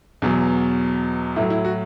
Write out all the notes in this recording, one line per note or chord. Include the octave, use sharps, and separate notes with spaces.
E2 B2 F#3
A2 F#3 E4
E4
F#4